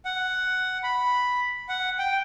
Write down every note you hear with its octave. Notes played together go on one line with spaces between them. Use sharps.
F#5
B5
F#5
G5